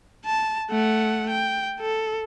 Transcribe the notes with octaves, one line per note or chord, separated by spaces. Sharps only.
A5
A3 F#5
G5
A4